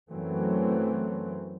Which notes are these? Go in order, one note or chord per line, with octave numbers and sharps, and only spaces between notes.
F#2 E3 F#3 A3 C4